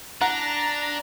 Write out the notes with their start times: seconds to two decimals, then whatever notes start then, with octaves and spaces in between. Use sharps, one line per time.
0.21 D4 F#5 A#5